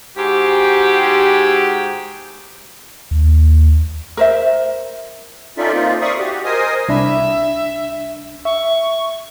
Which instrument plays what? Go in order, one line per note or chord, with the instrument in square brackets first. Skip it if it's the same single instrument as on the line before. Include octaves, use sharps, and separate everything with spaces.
[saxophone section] G#2 F#4 G4
[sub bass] D#2
[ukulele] A#4 C5 E5
[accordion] C#4 D#4 F4 A4 D5 E5
A#3 C4 D#4 F4
D5 E5 F5 B5 C#6 D#6
F#4 G4
A#4 C5 D#5 G#5 D#6
[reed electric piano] C2 D4 B5 [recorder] E5
[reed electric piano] E5 [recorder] C#6